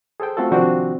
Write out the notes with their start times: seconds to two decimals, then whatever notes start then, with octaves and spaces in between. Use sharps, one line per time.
0.20 G#4 A4 C5 G5
0.37 A3 C4 F4 F#4 A4
0.51 C3 D#3 F3 C4 D4 F#4